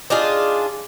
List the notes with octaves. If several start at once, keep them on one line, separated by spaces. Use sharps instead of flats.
D4 D#4 F4 G#4